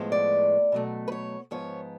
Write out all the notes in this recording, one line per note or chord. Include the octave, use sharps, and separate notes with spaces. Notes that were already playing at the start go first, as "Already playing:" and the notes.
Already playing: A2 F3 G#3 B3
D5
B2 F#3 A3
B4
C#5
G#2 F3 B3 C#5